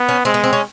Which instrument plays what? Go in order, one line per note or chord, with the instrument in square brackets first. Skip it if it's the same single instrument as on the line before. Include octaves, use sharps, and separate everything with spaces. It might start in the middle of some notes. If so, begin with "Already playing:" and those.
Already playing: [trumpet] B3
[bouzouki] C#4
[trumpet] G#3 [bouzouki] C4
[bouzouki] B3
C4
C#4